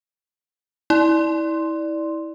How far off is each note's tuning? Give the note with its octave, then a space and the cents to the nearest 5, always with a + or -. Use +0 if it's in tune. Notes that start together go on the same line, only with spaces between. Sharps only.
E4 -25 D5 +0 C6 +0